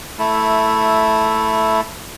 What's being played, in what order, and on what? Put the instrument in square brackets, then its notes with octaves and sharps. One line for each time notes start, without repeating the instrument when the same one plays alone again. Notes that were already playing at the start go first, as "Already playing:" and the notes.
[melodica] A3 E4